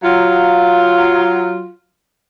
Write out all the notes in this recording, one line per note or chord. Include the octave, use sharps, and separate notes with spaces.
F#3 F4